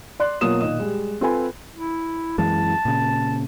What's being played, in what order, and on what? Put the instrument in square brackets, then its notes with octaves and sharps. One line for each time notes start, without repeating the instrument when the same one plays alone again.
[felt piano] D5 C6 F#6
B2 F#3 A#3 F4 D#6 E7
A#2 D#3 D#5 D#6
G3 G#3
C4 F4 A4 B4 G#5 B5
[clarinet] E4
[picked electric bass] F#2 E3 G#3 [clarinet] A5
[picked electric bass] A#2 C#3